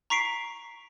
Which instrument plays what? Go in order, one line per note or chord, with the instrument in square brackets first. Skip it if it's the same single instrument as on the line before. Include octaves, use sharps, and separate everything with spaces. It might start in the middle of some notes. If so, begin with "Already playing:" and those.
[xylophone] A#5 C#6 B6 C7 D7